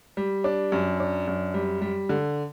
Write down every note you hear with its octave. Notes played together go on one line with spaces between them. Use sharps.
G3
D4
F#2
D4
F#2
G3
G3
D3